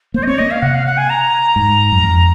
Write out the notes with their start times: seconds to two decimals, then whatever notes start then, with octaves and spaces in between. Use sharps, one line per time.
0.14 A#3 C5
0.23 D#5
0.27 C4 C#5
0.38 A#3 D#5
0.51 F5
0.62 C3 F#5
0.74 F5
0.86 F#5
0.97 G#5
1.09 A#5
1.56 G#2
1.92 F#2
2.04 F2